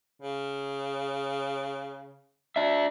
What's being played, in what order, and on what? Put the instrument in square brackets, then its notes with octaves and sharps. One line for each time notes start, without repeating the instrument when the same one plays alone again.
[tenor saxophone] C#3
[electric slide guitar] D4 E5